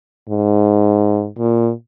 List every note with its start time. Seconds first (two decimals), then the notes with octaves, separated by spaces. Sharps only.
0.29 G#2
1.38 A#2